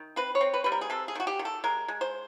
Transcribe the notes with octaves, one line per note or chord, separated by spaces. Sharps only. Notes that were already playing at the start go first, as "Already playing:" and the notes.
Already playing: D#3
C4 B4
C#5
C4
B4
G3 B4
A#4
G#4
C3 A4
G#4
D#3 F#4
G4
D#3
A4
G#3 A#4
G#3
C5